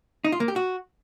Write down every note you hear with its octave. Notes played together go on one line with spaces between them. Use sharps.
D#4
F4
A#3
G4
F#4